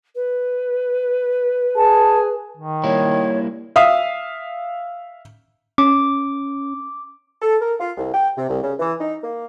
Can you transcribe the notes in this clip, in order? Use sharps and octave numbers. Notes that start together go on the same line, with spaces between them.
B4
G#4 A5
D#3
G3 A#3 E4 C#5
E5 F5 D#6
C#4 D6
A4
A#4
F4
C2
G5
C3
C2
C#3
E3
D#4
A#3